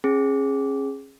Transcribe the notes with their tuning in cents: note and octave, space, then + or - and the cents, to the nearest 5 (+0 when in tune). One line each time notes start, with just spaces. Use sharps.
C#4 -30 G#4 +0